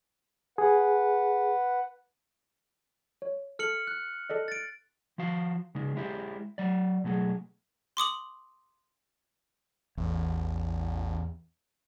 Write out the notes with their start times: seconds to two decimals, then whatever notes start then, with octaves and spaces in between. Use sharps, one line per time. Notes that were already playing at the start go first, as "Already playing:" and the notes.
0.58 G#4 B4 F#5
3.22 C#5
3.59 A4 F6 C#7 F#7
3.87 F#6
4.30 A4 D5 D#5
4.48 A6 D7
5.18 F3 F#4 F5
5.75 C#3 G#3 D#4
5.96 G#3 E4 G4
6.58 F#3 D5
7.04 B2 F#3 A3 G#4
7.97 C6 D6 D#6 F#7
9.98 A1 E2